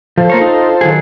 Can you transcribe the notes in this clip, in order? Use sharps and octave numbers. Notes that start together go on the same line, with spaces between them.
F3 F4 A4 C5
A#3 A#4 C#5
D#4
D#3 F#3 G#4